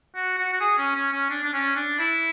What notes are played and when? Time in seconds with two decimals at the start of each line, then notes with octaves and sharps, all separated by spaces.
0.15 F#4
0.37 F#4
0.53 F#4
0.60 G#4
0.78 C#4
0.95 C#4
1.12 C#4
1.30 D4
1.43 D4
1.53 C#4
1.76 D4
1.99 E4